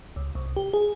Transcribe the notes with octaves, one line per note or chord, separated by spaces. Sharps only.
C#2
C2
G4
G#4